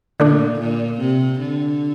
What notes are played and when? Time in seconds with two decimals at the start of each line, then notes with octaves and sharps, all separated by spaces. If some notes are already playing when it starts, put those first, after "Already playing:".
0.20 A#2 D3 A3 D4
0.60 A#2
1.00 C3
1.40 D3